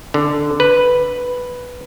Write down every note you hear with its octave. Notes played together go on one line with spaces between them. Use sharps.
D3
B4